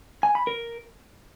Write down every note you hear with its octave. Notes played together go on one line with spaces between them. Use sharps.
G#5
B5
A#4